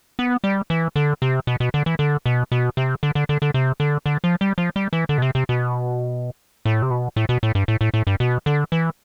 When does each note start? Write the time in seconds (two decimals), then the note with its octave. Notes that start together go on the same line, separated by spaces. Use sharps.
0.19 B3
0.44 G3
0.70 E3
0.96 D3
1.22 C3
1.47 B2
1.60 B2
1.74 D3
1.86 E3
1.99 D3
2.26 B2
2.52 B2
2.77 C3
3.03 D3
3.15 D3
3.29 D3
3.42 D3
3.54 C3
3.80 D3
4.06 D3
4.24 F3
4.41 G3
4.58 F3
4.76 G3
4.93 E3
5.09 D3
5.18 B2
5.22 C3
5.35 C3
5.49 B2
6.65 A2
6.82 C3
6.91 B2
7.16 A2
7.29 B2
7.43 A2
7.55 G2
7.68 A2
7.81 A2
7.94 A2
8.07 G2
8.20 B2
8.46 D3
8.72 E3